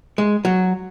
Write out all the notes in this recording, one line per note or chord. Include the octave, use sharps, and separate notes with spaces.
G#3
F#3